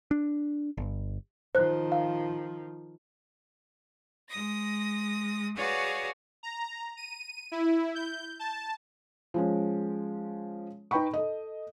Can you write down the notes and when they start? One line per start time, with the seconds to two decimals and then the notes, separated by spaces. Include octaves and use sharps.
0.11 D4
0.77 G1
1.55 D#3 F3 C5 F#6
1.92 F5
4.29 G#3 D#6 A#6
5.56 F#4 G#4 B4 C#5 D5 F5
6.43 A#5
6.97 D#7
7.52 E4
7.95 G6
8.39 A5
9.34 F3 G#3 C#4
10.91 D#4 B4 G5 B5 C#6
11.13 A4 D#5